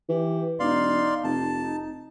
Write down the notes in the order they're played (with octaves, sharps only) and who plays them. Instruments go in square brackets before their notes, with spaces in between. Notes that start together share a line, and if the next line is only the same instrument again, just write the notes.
[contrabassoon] E3 [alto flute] G4
[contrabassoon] E1 [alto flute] D#4 [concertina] D5 F5 C6
[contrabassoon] F1 [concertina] A5
[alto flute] D#4